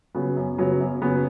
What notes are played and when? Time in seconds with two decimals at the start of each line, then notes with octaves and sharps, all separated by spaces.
0.15 C#3 F#3 B3
0.36 F#2
0.58 C#3 F#3 B3
0.80 F#2
1.02 C#3 F#3 B3